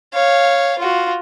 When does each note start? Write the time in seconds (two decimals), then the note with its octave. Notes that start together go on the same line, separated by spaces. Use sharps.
0.14 C#5 F5
0.79 F4 F#4